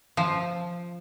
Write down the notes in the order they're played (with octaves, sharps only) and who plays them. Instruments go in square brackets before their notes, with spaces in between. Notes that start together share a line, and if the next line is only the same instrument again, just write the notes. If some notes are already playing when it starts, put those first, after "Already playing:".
[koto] F3